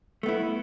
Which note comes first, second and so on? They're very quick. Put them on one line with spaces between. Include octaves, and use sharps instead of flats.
A3 B3 E4